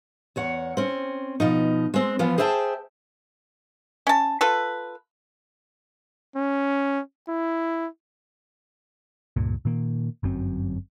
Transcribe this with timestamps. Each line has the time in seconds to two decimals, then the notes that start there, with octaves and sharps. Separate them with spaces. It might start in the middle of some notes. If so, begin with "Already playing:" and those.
0.36 E2 C#5 F#5
0.77 C4 C#4
1.40 B2 F3 D#4
1.94 G#3 C4
2.19 E3 F3 B3 F4
2.38 G#4 C5 E5 G5 A5
4.07 C#4 A5
4.41 F4 A4 B4
6.36 C#4
7.29 E4
9.36 C#2 G2 A#2
9.65 A#2 D#3 A#3
10.23 G1 F#2 F#3 C4